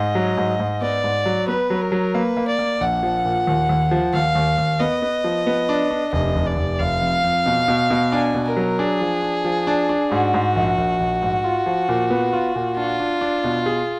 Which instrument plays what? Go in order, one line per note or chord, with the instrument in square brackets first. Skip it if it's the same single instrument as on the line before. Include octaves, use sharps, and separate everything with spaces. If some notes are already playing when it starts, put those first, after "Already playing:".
Already playing: [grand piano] G#2 [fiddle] D#5
[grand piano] F#3
G#2
G#2
[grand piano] B3 [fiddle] D5
[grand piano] G#2
F#3
[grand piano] B3 [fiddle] B4
[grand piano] F#3
[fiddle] A#4
[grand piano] F#3
[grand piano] A#3 [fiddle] B4
[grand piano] A#3
[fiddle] D5
[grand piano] A#3
[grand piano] A#1 [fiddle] F#5
[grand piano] F3
A#2
D#2
D#2
F3
[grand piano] D#2 [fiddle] F5
[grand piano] D#2
D#2
[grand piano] B3 [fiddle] D#5
[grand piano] B3
F3
B3
D4
D4
[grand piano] F1 [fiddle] D#5
[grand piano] F1
[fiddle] D5
[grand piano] F1
[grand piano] F1 [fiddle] F5
[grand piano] F2
F2
B2
B2
B2
[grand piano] D4 [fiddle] G#5
[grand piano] B2
[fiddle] A#4
[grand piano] F#3
[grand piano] D4 [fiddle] G#4
[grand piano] F3
D4
F3
D4
D4
[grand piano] G#2 [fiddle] F#4
[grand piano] G#2
A#1
A#1
A#1
G#2
F4
F3
A#2
B3
F4
A#2
[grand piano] D4 [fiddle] F4
[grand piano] D4
D4
B2
G#4